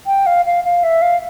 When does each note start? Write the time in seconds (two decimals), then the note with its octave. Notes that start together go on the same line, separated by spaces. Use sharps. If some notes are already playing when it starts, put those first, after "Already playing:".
0.06 G5
0.26 F5
0.46 F5
0.65 F5
0.83 E5
1.02 F5